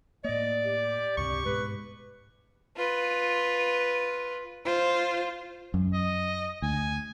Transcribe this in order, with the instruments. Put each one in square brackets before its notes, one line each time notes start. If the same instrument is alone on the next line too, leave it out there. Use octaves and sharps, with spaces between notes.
[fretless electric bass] A2 A#3 [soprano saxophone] D5 [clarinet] D#5
[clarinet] G4
[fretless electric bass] C#2 G2 C3 [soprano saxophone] C#6
[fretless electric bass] G#2 B2 G#3 [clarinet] B4
[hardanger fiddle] F4 B4
[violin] F4 [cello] C5
[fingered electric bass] F#2
[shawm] D#5
[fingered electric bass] D2 [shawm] G#5